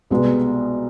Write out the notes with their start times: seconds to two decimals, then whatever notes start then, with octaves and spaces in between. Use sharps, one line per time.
0.10 C2 B2 G#3 B3